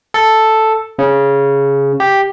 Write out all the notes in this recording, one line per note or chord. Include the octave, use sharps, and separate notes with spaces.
A4
C#3
G4